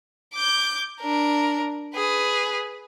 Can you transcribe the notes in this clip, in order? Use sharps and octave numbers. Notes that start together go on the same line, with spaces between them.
D6 G6
D4 A#4
G#4 B4